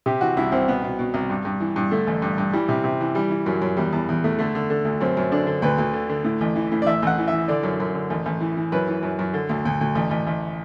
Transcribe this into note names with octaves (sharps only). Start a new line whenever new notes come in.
C3 G4
E3 F#4
C2 E4
C2 C4
B2 B3
B2
B2
C2
G2
G2
E3
G2
D3 A3
A1
G2
G2
E3 G3
C3
C3
E3
E3 G3
E3
F#2 F#3
F#2
E2 G3
E2
E2
E2 A3
D3 A3
D3
D3
D2
F#2 C4
F#2
D3 D4
D3
D2 B4
D2
D3
D3
A2
A1
E3
A2
D5
A1 E5
A1 F#5
E3
E5
E3
D3 D5
F#2
F#2
D3
A1
A1
E3
E3
F#2 B4
E3
F#2
F#2
D3
D2
D2
D2
A1
A1
A1